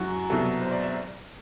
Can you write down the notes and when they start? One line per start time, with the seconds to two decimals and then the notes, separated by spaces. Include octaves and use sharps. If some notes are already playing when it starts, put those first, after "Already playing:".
Already playing: F#2 F#3 E4 F#4
0.30 C2 B2 F#3 A4
0.62 C5
0.71 D5
0.83 E5